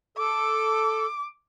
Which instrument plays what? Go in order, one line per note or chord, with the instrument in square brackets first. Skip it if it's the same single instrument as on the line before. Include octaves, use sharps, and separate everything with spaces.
[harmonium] A4 [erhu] D6